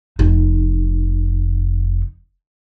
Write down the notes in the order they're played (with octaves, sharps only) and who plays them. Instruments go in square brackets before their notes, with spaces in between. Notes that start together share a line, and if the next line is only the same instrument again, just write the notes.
[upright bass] F1 D#4